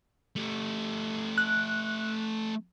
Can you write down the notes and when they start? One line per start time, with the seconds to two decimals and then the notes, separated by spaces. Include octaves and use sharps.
0.36 A3 G4
1.38 F#6